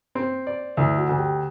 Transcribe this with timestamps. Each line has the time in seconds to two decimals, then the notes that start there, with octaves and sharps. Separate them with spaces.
0.15 C4
0.47 D5
0.77 D2 E4 E5
0.98 F#4 F#5
1.09 D2
1.18 G4 G5